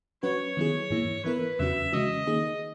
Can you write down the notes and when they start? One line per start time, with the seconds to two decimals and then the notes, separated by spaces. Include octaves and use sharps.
0.23 F#3 C#4 F#4 B4 C#5
0.57 D#3 F#3 B3 E4 G#4
0.90 G#2 E3 A#3 E4
1.24 E3 B3 E4 A#4 B4
1.59 E2 C#3 F#3 C#4 F#4 E5
1.92 C#3 E3 G#3 C#4 F#4 D#5
2.27 D#3 A#3 D#4 G#4